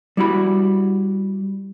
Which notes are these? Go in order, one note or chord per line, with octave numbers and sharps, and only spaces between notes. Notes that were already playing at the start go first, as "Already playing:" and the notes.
G3 E4 F#4 B5